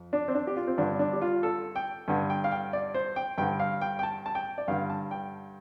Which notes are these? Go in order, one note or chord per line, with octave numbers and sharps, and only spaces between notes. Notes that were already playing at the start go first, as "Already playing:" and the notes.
Already playing: F2
D4
C4
D4
G4
F4
C4
G2 D3 D4
D4
G4
F4
A4
G5
G2 D3
G5
F5
G5
D5
C5
G5
G2 D3 G5
F5
G5
G5
A5
A5
G5
D5
G2 D3 F5
A5
G5